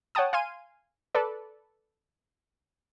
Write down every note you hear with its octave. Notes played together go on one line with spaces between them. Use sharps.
C#5 F#5 G5 A5 D#6
F5 G#5 C6 D#7
A4 B4 D5